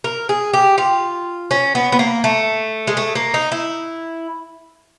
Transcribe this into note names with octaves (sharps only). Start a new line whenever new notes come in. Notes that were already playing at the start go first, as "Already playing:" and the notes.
A#4
G#4
G4
F4
C#4
B3
B3
A#3
A3
G#3
A3
A#3
D#4
E4